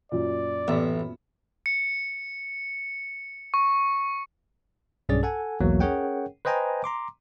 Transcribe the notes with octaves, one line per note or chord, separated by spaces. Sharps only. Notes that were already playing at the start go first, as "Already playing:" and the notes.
F#2 A#2 D5
A1 B3 E5 B5
C#7
C#6
B1 G2 C#4 G#4 D5 A6
A4 F#5 G#5
B1 E2 E3 F#3 A#3
C#4 G#4 A#4 C#5 F#5 G5
B4 C5 D#5 G5 G#5 A#5
A#5 C6 D6